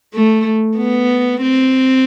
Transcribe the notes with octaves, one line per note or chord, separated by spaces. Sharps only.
A3
B3
C4